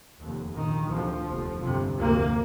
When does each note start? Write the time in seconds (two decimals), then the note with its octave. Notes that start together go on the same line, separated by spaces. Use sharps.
0.21 F1 D#2
0.56 A#1 A#2 D#3
0.91 D2 C3 F3
1.28 F1 D#2
1.62 G1 F2 C3
1.98 D2 C3 A#3